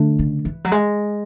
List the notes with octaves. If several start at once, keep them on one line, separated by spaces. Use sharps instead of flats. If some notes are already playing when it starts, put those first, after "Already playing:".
Already playing: D3 A3 D4
C#3
E3
F#3
G#3